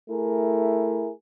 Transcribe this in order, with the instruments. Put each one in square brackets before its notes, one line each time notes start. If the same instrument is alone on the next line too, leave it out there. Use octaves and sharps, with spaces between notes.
[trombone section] A3 E4 G#4 A#4